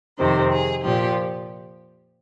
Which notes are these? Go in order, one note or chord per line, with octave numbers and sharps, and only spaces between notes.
F2 C3 D#3 C5
G#4
A#2 F3 G4